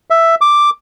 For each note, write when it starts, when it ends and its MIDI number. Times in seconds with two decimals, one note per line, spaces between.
0.10 0.35 76
0.41 0.70 86